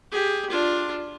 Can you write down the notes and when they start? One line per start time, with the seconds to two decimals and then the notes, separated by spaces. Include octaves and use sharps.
0.12 G4 G#4
0.50 D4 F4